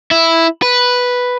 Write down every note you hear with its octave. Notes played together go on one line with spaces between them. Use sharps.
E4
B4